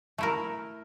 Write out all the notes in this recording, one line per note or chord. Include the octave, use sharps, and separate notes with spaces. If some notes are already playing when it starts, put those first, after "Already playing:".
A3 E4 A#4